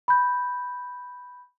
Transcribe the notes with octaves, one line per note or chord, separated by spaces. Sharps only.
B5 G6